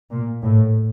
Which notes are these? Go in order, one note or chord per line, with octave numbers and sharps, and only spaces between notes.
A#2
A2